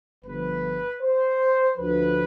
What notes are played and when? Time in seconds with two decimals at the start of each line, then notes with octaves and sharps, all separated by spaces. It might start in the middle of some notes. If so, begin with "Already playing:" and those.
0.25 G1 G2 F3 B4
1.02 C5
1.78 D2 D3 F3 B4